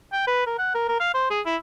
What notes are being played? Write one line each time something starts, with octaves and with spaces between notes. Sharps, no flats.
G5
B4
A#4
F#5
A#4
A#4
F5
C5
G#4
E4